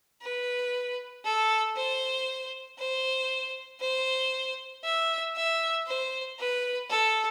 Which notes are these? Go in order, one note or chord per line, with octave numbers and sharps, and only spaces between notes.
B4
A4
C5
C5
C5
E5
E5
C5
B4
A4